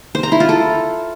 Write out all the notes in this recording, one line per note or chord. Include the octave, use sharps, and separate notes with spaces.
C5
A#5
E4
F4
A4